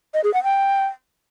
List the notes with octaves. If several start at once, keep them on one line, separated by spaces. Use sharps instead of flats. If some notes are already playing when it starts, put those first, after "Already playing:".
D#5
G#4
F#5
G5